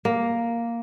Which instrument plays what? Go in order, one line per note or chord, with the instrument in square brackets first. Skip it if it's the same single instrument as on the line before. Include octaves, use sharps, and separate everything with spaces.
[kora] A#3